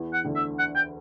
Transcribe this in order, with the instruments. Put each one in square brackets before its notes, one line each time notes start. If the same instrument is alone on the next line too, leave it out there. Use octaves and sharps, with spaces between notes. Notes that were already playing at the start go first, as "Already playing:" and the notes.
Already playing: [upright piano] E2 E3
[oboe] F#5
[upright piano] D2 D3
[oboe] E5
F#5
G5